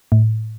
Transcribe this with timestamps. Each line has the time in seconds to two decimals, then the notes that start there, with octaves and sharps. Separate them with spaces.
0.12 A2